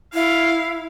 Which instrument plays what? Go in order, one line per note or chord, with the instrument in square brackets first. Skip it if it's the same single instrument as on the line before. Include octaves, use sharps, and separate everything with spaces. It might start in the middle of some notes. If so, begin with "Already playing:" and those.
[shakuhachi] E4 [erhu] F5